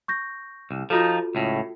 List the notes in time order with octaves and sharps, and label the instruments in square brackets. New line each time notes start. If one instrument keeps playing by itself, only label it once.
[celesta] C#6 G6 A#6
[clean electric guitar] C2
[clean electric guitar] F3 D#4 [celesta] F4 F#4 A4
[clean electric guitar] C#2 A2